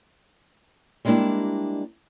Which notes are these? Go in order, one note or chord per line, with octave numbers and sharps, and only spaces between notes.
G3 G#3 A#3 D4 E4 G4